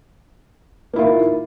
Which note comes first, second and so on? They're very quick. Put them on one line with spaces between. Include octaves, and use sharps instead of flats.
A#3 E4 F4 D#3